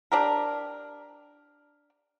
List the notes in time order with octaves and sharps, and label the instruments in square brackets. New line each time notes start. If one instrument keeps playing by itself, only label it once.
[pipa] D4 G4 A#4